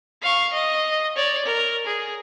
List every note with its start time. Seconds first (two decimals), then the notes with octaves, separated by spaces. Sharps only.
0.21 F5 C#6
0.53 D#5
1.16 C#5 D5
1.45 A#4
1.86 G#4